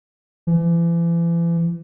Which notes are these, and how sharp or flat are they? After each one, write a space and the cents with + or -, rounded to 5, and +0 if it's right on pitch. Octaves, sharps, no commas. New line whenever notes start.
E3 +40